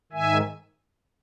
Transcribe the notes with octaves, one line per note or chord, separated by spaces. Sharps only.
G#2 D#3 E5 G#5